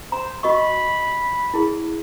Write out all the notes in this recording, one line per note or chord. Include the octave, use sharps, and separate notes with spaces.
C5 A#5
F#4 D#5 B5 C#6
E4 G#4